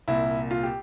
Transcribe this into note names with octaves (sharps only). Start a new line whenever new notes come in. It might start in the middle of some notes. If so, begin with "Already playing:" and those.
C2 A#2 E4
F4
G4